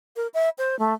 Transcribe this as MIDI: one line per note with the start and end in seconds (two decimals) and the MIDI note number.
0.16 0.27 70
0.34 0.49 76
0.58 0.78 72
0.79 0.94 57